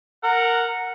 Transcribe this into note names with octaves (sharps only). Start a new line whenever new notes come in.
A#4 F#5